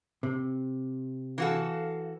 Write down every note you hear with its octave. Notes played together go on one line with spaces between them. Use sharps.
C3
E3 F#4 A4 F5